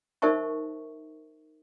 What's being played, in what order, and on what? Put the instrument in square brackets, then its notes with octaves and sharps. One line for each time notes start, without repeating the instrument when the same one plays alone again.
[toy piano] D#4 A#4 C5 E5 A5 C#6